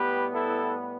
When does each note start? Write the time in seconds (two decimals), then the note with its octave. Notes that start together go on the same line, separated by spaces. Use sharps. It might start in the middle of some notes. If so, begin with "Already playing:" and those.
Already playing: A2 G3 B3 G4 B4
0.33 E4 A4